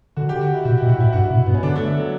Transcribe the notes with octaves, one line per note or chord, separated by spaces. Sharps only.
D3 F#4
G4
F#4
E4
B2 F#4
B2 E4
F#4
A2 E4
G2 F#4
E4
B2
G2 B3
C#4
D3 D4
A3
A3
F#3